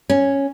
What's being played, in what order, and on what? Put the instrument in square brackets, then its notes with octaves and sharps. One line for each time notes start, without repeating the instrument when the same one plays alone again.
[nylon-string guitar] C#4